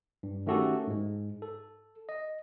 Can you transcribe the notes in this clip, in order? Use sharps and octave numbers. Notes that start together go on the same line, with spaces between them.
G2
D#3 A3 C#4 F#4 G4 A4
G#2 G#3
A4
D#5